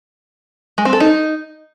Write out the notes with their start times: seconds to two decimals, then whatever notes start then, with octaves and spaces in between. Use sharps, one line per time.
0.78 G#3
0.85 C4
0.93 A4
1.00 D#4